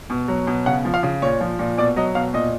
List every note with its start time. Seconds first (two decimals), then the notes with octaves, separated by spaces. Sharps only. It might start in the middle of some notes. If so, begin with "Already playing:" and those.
0.10 B2
0.28 F#3
0.47 B2
0.66 C#3 F#5
0.85 F3
0.94 F5
1.03 C#3
1.22 A#2 C#5
1.41 F3
1.59 A#2
1.78 B2 D5
1.96 F#3 D#5
2.15 B2 F5
2.34 A#2 D#5